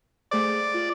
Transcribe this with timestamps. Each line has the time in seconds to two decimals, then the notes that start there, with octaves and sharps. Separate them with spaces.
0.31 A3 G#4 C5 D5
0.74 F4